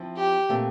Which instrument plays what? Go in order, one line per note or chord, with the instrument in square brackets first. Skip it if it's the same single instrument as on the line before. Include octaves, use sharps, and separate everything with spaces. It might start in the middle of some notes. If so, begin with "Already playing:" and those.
Already playing: [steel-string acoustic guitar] F3 C4 E4
[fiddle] G4
[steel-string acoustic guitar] A#2 A3 C4